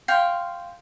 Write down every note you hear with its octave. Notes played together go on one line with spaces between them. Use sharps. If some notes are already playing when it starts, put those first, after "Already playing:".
F5 G5 C6 C#6